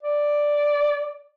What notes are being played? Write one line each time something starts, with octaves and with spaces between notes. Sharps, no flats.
D5